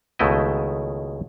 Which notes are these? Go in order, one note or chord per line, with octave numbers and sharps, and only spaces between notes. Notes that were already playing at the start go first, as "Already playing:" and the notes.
C#2 B2 D#3 A3 E4 D#5